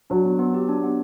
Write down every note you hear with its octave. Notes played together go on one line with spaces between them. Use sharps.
F#3 D4
B3
B3
G4
D4
B3